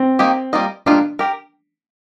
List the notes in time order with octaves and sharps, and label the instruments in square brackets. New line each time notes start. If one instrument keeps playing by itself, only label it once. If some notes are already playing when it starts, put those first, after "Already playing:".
Already playing: [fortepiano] C4
[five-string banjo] D#3 A#3 D#4 G4
G3 A#3 F4 A#4 D#5
[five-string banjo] G3 A#3 F4 A#4 D#5 [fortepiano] D4
[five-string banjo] G4 A#4